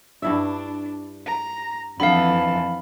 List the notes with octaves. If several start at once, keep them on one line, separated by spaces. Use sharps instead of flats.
G2 D4 E4 E5
A#5
F2 D3 E3 B3 A4 F5 B5